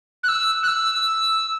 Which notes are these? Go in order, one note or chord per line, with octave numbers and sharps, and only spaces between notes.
F#6
E6
F#6
E6